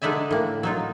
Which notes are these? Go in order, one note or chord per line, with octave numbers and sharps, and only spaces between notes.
D3 G#3 D#4 D5 E5 G#5
A2 A#3
F#3 D#4 F4